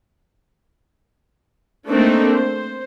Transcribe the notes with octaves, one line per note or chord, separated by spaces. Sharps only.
A3 A#3 C4 D4 D#4
C5